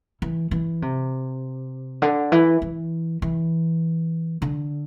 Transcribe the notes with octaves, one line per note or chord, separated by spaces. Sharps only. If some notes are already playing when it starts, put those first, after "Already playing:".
E3
E3
C3
D3
E3
E3
E3
D3